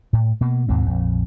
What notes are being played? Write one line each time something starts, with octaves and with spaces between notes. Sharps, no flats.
A2
B2 A#3
D#2 G#2 B2 C4
A#1 F2